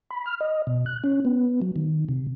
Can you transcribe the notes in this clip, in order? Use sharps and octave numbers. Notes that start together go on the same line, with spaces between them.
B5
F6
D#5
B2
F#6
C#4
B3
F#3
D#3
C3